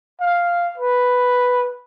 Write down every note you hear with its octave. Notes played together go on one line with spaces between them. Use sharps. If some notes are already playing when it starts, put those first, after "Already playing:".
F5
B4